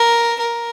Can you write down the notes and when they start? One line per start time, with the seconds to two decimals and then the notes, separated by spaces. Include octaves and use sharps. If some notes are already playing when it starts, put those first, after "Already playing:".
Already playing: A#4
0.40 A#4